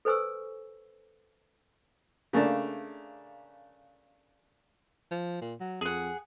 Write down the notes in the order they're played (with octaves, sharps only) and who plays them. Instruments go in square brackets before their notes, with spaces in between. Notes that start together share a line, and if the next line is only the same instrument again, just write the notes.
[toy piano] A4 B4 C5 G#5 C#6 E6
[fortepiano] C#3 A3 A#3 D4
[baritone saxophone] F3
A#2
F#3
[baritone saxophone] F2 [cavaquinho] G#4 F#5